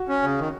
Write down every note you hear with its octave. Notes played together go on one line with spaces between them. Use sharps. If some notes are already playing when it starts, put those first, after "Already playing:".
Already playing: F#4
C#4
C#3
D#3